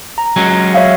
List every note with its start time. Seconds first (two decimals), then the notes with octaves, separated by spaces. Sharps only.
0.18 A#5
0.36 F#3 G#3 C#4
0.74 C#5 E5 F5